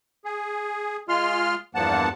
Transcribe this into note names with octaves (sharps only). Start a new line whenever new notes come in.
G#4
G#3 F4 C6 F6
E2 G2 F3 A#3 F#5 A5